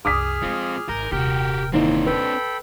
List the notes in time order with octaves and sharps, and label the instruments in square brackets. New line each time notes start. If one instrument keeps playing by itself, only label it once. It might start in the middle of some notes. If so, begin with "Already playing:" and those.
[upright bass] C2 F#2 [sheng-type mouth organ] G#4 F6 [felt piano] D6 D#6 B6
[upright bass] F3 G#3 [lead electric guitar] C4 F4
[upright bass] G#1 [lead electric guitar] A#4 [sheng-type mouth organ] G#5 G6
[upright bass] D#1 C3 [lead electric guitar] F#4 G4 [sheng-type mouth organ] A#4 G5
[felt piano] D#2 E3 D#4 [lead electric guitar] C4 D4
[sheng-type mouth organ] A4 G5 B5 [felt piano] B4